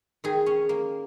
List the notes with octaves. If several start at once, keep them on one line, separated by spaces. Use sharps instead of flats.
D#3 G#4
C#4
A#3